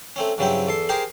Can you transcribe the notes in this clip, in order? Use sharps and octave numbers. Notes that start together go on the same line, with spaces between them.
A3 C4 C#4
G2 C#3 F#3 C4 E4 G5
E2 A4 C6
G4 G#4 A#4 C5 G5